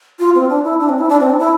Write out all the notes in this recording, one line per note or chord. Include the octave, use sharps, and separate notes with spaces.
F4
C4
D4
E4
D4
C4
E4
D4
C4
D4
E4